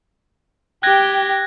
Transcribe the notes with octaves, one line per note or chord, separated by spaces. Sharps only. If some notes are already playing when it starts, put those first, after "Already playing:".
G4 G5 F#6 G#6 A#6